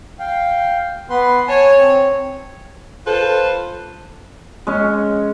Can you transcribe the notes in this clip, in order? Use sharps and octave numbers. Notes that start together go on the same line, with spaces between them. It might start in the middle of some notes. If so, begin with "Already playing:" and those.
F5 G5
B3 B4 C6
C#5 G#5 A5
C4
F4 A4 B4 C5
G#3 C#4